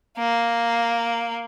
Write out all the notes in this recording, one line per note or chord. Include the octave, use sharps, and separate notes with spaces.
A#3